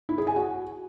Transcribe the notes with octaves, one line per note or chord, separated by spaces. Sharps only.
E4
G#4
G#5
F#4